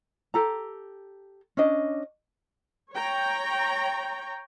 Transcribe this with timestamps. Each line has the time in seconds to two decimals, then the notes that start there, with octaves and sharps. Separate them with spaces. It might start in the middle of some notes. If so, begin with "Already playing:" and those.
0.34 G4 A4 A#5
1.57 C#4 D4 D#5
2.92 C#5 G5 A#5